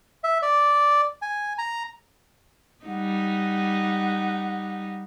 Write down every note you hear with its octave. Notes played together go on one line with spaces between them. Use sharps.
E5
D5
G#5
A#5
G3 D#4 F#5